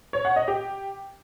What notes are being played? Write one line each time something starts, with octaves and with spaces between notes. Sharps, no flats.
C#5
F#5
D#5
G4